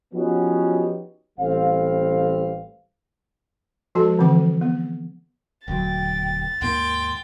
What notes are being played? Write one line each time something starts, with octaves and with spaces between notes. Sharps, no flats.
F3 B3 C#4 D#4 F#4 G4
A1 G3 C4 F5
F3 G#3 F#4 A4 A5
D3 E3 F3 C4 D6
B3
D#1 D2 F#3 G5 A6
D#2 G#2 A#3 G5 C6